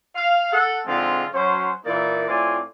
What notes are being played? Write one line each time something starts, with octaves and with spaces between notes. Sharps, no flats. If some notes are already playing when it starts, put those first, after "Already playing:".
F5
A4 F#5
G#2 D3 F3 G#3 C4 F4
F#3 C#4 C5
A#2 E3 A#3 D#4 E4 D5
A2 A3 C4 F4 D5 G#5